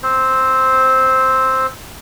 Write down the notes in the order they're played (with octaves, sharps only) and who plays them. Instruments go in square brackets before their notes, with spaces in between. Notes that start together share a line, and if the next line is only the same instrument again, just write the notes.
[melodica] C4 C5